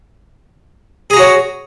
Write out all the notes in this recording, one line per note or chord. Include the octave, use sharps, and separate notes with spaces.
F#4 G#4 C#5 A#5